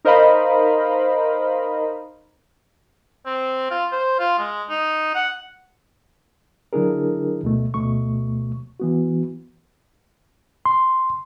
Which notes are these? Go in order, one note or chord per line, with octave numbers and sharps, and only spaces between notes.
D#4 A#4 C5 D#5 F5 B5
C4
F4
C5
F4
G#3
D#4
F#5
D3 F#3 D4 E4 G#4 A#4
D2 B2 A3
D2 B2 A3 C#6
E3 B3 F#4
C6